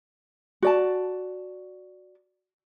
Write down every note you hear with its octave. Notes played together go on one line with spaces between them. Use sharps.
F#4 D5 A5